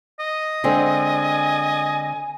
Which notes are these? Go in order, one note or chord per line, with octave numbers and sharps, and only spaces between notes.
D#5
D3 G#3 C4 G#5